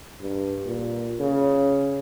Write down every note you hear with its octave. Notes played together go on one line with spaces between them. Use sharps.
G2
A#2
C#3